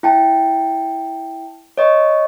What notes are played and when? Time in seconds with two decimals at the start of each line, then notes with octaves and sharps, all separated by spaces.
0.03 E4 G5 A5
1.78 C#5 D#5 C#6